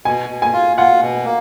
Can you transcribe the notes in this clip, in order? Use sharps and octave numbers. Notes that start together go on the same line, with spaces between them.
B2 G#5
B2
G#5
F4
F4 F#5
B2
A#3